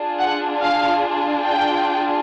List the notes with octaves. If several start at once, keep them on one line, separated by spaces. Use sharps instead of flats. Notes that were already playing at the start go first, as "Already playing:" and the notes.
Already playing: D4 F4 G#4
F#5
F5
G5